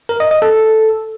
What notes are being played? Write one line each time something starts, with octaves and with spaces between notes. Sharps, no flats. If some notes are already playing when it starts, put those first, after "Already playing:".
A#4
D#5
D#5
A4